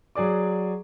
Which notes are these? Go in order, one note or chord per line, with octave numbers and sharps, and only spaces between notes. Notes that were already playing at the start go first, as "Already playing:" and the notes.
F#3 G#4 D5 D6